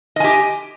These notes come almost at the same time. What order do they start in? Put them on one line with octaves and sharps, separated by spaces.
D#5 G#5 G4